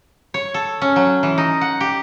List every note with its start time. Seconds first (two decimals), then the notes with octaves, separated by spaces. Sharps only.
0.34 C#5
0.54 A4
0.81 C#4
0.96 F#3
1.23 E3
1.38 D#4
1.61 F#5
1.80 G4